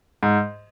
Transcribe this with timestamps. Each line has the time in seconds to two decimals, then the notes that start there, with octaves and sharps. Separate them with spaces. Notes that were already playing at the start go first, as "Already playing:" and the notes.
0.23 G#2